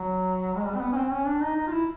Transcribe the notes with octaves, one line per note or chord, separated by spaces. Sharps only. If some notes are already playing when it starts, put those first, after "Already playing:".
Already playing: F#3
G#3
G3
C4
B3
C#4
C4
C#4
D4
D#4
D#4
F4
E4